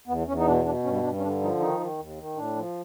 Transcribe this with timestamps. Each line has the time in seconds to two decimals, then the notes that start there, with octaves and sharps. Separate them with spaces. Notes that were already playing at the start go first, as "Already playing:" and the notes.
0.07 E2 B3
0.27 E2 C#4
0.38 D#4
0.46 B2 D4
0.65 B2 D4
0.84 G2 C#4
1.03 G2 D4
1.18 C#4
1.22 D3 D4
1.41 F3 D#4
1.60 D#3 D#4
1.80 D#3
1.98 D#2
2.18 D#3
2.36 A2 D4
2.56 F3